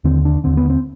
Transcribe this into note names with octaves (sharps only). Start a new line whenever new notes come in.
D#2 D3 C4
D4
D#2 D3 C4
B3
C4